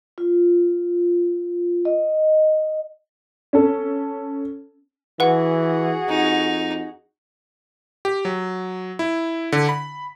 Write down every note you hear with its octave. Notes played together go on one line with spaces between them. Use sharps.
F4
D#5
C#4 A4
E3 F#4 G#4 B4 F#5
F2 D#4
G4
F#3
E4
D3
B5